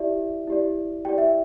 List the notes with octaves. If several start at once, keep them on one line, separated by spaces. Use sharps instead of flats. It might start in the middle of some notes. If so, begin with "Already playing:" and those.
Already playing: E4 G4 D5 E5
E4 G4 D5
E4 G4 D5 G5
E5